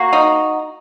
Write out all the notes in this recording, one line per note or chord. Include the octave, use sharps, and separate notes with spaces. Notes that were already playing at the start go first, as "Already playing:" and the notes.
Already playing: A#3 F#4
D#4